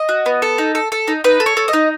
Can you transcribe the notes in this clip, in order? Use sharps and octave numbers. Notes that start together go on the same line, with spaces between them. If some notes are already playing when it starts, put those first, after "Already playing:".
Already playing: D#5
F#4
B3
A4
D#4
A4
A4
D#4
D#4 B4
A4
C#5
A4
D#5
D#4